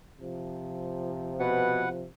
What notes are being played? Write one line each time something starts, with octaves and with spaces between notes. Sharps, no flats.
C3 F3
B2 B4 F#5